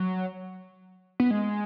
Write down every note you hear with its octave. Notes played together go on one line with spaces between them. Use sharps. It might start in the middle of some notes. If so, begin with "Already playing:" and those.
Already playing: F#3
B3
G#3